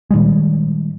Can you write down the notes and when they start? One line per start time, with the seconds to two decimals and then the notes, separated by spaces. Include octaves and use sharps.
0.11 A#2 D#3 G3 G#3